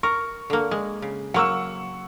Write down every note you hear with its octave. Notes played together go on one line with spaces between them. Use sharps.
A#4 C#6
D3 A#3
G#3
C#3
F#3 A#3 F#5 C#6 E6